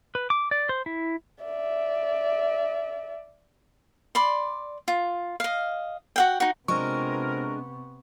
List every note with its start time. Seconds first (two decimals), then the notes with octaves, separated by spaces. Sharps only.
0.15 B4
0.30 D6
0.51 D5
0.69 C5
0.86 E4
1.44 D5 E5
4.15 D5 B5 C6
4.88 F4
5.40 D#5 F5
6.16 F#4 F#5 G5
6.40 D#4 F#4
6.68 C3 G#3 B3 C4 D4 F4 A#4 C#6